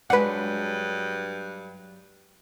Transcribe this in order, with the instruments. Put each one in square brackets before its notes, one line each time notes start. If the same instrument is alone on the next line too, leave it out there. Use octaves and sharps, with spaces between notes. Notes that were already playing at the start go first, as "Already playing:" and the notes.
[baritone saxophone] G2 [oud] F#3 G#3 D4 [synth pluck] B4 F#5